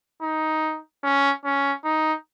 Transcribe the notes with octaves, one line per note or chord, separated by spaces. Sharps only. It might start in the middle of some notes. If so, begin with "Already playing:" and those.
D#4
C#4
C#4
D#4